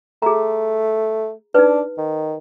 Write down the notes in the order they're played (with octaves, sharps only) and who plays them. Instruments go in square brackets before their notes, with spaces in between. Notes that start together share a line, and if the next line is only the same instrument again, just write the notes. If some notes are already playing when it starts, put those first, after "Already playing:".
[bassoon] A3 [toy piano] G#4 A#5
[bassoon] D4 [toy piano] D#4 B4
[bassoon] D#3